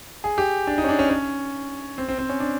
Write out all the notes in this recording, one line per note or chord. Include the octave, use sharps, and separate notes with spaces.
G#4
G4
D4
D#4
C#4
D4
C#4
C#4
C4
C4
C4
C#4
D4